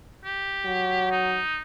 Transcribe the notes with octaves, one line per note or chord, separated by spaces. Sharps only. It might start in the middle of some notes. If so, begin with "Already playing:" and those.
G4
F#3
D#4